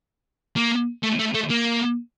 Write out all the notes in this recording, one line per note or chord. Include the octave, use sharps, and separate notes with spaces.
A#3
A3
A3
A3
A#3